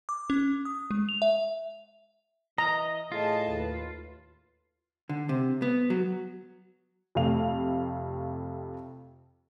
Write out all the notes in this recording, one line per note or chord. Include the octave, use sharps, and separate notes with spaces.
D6
C#4
D#6
G#3
F7
E5
E3 D#5 A#5
A2 F4 G#4 D#5 A5
D#2 B4
D3
C3
B3
F#3
F2 C3 A3 F5 F7